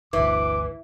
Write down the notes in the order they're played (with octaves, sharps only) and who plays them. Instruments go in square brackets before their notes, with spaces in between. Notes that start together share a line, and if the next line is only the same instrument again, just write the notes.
[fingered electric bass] G1 D2 [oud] E3 [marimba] E5 [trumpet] D6